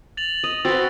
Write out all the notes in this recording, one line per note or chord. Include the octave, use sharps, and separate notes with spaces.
A6 F7 F#7
D#5
C4 F#4 B4 E6 A6